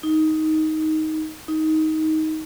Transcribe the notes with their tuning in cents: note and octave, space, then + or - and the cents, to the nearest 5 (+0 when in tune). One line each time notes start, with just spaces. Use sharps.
D#4 +10
D#4 +15